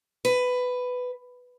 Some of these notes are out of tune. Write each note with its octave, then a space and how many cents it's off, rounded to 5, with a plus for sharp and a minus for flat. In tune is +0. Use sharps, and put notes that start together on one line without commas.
B4 +10